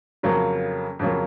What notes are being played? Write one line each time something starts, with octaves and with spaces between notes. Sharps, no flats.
F2 C#3 F#3 A#3
F2 C#3 F#3 A#3